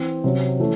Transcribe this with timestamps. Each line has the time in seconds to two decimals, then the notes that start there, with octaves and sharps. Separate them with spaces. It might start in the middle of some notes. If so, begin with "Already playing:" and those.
Already playing: E3 C4
0.24 C3 F#3 C#4
0.60 E3 A3 C#4